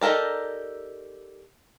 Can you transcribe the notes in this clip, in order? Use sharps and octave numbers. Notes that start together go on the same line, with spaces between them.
D#4 G4 A4 A#4 D5